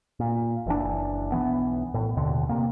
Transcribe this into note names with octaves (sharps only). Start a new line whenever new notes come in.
A#2
F#1 E3 D4
B1 E3 B3
A2
D#2 B2 D3
C3 A#3